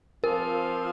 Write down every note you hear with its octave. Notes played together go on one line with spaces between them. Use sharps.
F3 C4 F4 A#4